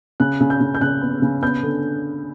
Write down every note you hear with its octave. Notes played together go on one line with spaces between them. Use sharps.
C#3 F#6
C#3
G6
C#3
G6
C#3 F#6
B3
C#3
B3 G6
D3